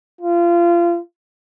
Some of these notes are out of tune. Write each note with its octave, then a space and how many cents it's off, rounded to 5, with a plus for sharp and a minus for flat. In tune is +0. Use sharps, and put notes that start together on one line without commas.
F4 -25